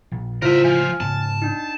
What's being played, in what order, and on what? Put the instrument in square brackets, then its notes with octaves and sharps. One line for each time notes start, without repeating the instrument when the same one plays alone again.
[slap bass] A#1
[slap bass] C#2 A2 C#3 [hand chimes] E4 F4 C5 [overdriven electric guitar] A#4 E5
[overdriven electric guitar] F3 [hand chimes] G#5 F6
[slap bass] G#2 C#3 B3 [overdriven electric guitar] A5
[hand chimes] D4 D#4